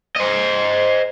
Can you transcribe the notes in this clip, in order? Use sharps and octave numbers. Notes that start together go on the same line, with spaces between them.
C5 D#5